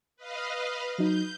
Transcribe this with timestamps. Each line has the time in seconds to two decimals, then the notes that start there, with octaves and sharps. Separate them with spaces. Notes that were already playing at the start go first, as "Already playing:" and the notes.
0.16 B4 D#5 F5
0.98 F#3 D#4 G6